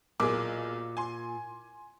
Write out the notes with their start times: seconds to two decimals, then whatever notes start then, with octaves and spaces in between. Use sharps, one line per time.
0.20 B1 A#2 G#4 D6
0.97 G#5 C6